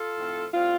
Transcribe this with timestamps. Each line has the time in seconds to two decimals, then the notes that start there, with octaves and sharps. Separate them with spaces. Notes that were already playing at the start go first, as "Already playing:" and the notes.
Already playing: F4 A4
0.16 A2 F3 C4
0.53 A2 G3 C4 F4